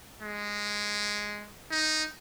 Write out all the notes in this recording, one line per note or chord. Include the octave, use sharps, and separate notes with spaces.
G#3
D#4